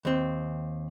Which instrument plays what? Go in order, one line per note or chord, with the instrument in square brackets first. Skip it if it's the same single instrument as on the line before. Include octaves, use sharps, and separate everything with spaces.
[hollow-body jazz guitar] D#2 C4